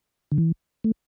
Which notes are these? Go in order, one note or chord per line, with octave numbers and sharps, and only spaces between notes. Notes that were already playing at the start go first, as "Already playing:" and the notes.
D3
E3
A3